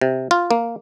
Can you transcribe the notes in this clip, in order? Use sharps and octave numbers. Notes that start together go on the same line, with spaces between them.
C3
F4
A#3